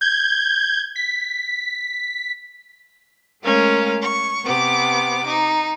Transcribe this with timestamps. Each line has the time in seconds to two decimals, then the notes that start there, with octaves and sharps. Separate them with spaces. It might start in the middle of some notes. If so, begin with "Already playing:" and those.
0.01 G6 G#6
0.96 B6
3.43 G#3 A3 C#4 A#4 F5
4.01 C#6
4.44 C3 B3 D6
5.27 D#4